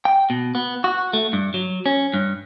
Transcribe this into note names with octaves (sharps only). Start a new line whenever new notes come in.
G5
B2
B3
F#4
A3
G2
F#3
C#4
G2